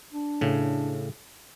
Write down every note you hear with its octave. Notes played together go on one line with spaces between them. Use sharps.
D4
A2 C#3